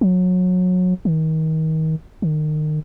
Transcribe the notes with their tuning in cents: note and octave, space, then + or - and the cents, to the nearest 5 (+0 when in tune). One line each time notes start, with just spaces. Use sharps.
F#3 -25
D#3 +30
D#3 -30